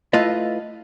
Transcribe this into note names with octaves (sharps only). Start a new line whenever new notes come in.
A3 E4 F4 B4 D#5